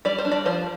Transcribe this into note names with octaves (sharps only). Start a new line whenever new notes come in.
G3 D5
C5
D4
D5
F3 C5